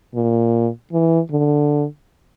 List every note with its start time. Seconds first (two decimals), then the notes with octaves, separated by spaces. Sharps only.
0.15 A#2
0.92 E3
1.31 D3